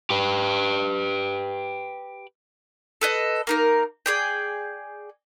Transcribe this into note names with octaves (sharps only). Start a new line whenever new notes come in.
G4 B4
A4 B4 D#5
A#3 D#4 A#4
G#4 D5 G5